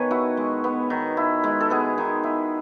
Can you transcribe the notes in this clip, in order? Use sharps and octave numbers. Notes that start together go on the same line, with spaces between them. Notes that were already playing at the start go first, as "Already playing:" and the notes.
Already playing: D#3 B3 B4 C#5 G#5
E4 F#4
G#3
B3
D#3
E4
G#3
A4
B3 G#4
D#3
E4